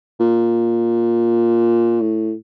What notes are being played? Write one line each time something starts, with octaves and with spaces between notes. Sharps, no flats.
A#2
A2